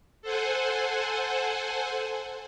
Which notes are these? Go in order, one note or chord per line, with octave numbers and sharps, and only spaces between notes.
A4 C5 F#5 G#5